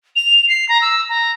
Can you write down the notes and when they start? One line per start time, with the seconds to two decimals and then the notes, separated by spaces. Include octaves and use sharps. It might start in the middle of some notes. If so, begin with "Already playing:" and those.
0.16 F7
0.49 C7
0.69 A#5
0.82 E6
1.09 A#5